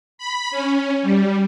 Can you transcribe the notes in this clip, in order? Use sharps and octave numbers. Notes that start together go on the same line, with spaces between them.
B5
C#4
G3